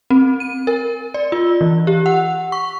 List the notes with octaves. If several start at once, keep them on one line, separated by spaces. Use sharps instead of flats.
C4
D#7
A#4
D5
F4
E3
G4
F#5
C#6